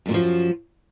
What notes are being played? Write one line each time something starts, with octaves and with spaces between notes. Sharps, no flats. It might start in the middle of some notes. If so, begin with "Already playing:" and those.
F#2 A#2 F3 F#3